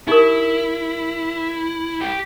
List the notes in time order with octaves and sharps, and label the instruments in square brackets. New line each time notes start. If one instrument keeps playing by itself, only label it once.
[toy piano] D#4 G4 A#4 [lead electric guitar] E4
[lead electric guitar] G4